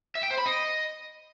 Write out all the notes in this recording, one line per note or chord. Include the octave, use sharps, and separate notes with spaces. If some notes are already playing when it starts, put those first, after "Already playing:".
E5
G5
C5
B5
D#5